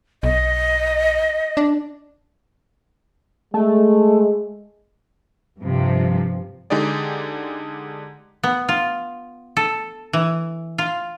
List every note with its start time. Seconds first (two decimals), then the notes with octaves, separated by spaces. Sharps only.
0.23 B1 D#5
1.57 D4
3.54 G#3 A3
5.61 G2 C3 F3
6.70 D3 G#3 D#4 G4 G#4 D5
8.43 B3
8.69 F4
9.57 A4
10.13 E3
10.78 F4